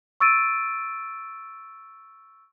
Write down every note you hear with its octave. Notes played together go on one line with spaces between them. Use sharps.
C#6 E6 A6 D7 D#7